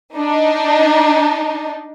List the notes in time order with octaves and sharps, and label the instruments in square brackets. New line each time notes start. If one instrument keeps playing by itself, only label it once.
[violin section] D4 D#4